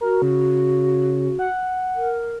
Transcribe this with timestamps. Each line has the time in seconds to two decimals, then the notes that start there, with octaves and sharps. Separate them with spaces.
0.01 F#4 A#4
0.22 C#3
1.39 F#5
1.96 A#4